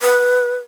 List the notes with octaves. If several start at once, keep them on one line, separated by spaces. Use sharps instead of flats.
B4